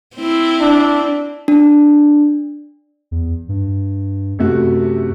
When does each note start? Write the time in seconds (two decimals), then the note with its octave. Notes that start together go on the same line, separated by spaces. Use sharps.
0.16 C4 E4
0.60 D4
1.48 D4
3.11 E2
3.49 G2
4.39 F#2 C3 A3 F#4